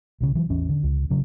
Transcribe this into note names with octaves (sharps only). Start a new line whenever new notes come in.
B1 C#3
E3 F#3
A1 E2 C#4
D3
C#2
F1 C#3 F#3